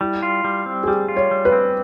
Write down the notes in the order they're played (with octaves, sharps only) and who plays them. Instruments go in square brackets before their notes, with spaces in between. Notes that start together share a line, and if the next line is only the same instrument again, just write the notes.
[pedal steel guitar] G3 [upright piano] E4
[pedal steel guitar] F4
G3
C4
[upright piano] G#4
[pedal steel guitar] G3 [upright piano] G4
[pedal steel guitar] F4
[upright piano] C#5
[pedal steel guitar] G3
[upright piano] B4
[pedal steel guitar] C4